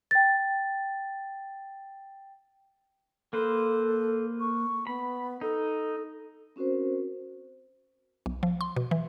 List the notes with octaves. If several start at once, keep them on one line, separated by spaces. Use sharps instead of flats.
G5 A6
A#3 A4 B4 C5
C#6
B3 B5
D#4 A4
C4 C#4 F#4 A#4 C5
B1
F3
C6
B2
E3